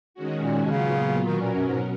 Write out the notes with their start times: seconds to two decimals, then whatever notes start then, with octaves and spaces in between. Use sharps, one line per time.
0.14 D#3 G#3 C#4 F#4
0.43 A#2
0.66 B2
0.70 A#2 C#3 F#3 B3 F4
1.26 B2 D#3 F#3 C#4 F#4 A#4
1.41 A#2
1.54 F#2
1.68 G#2